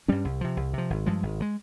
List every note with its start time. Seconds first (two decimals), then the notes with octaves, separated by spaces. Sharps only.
0.08 G2 G3 C#4
0.25 C2
0.41 C3 F3
0.57 C2
0.73 C3 F3
0.90 G#1
1.06 G2 F3 G#3
1.23 G#1
1.40 F3 G#3